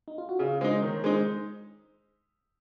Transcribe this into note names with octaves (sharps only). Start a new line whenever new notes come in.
D#4
F4
F#4
C#3 F4 G#4
G#3 D#4 G#4 C5
D#3 A#4 C#5
G#3 D#4 G#4 C5